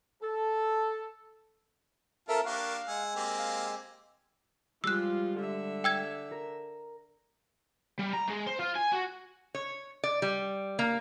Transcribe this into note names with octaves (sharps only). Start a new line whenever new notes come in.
A4
C4 F4 A4 A#4 E5 F5 A5
A#3 D4 G4 A#4 F5 C#6 F#6
G#3 F#5 G#5 E6
A#3 C4 G4
F5
F3 G3 G#3 F4 G4 E6 F#6
D3 E5
G5 E6 G#6
A#4
G3
A#5
G#3
C5
F4
G#5
F#4
C#5
D5
G3
A#3